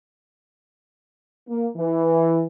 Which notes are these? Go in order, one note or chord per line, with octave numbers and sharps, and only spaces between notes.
A#3
E3